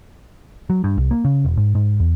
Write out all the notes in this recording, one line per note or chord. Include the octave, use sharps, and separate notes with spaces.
F#3
G2
C2
A#3
C#3
E1
G#2
G#2
E2